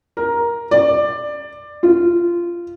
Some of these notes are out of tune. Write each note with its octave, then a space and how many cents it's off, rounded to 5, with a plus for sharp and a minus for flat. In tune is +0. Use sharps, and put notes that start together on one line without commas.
A#4 +10
D5 +15
F4 -15